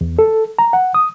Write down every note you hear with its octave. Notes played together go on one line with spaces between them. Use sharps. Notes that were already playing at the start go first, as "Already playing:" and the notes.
E2
A4
A#5
F#5
D#6